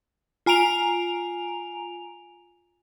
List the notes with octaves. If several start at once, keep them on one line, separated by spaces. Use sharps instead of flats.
F4 G#5 A#5 D7 F7